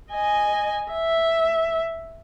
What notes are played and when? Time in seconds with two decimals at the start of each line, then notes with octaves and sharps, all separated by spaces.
0.12 D#5 G#5
0.92 E5